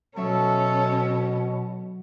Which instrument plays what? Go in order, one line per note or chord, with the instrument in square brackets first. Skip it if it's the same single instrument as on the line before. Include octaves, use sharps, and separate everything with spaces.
[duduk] B2 [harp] F#3 C#5 E5 [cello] C#4 [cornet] A4